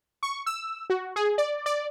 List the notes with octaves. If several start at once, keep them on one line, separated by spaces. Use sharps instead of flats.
C#6
E6
F#4
G#4
D5
D5